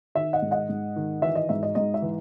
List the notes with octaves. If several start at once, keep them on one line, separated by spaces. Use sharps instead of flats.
D#3 E5
D#5 F#5
G#2
D#5 F#5
G#2
D#3
E3 E5
D#5
G#2 E5
D#5
G#2 D#5
E5
E3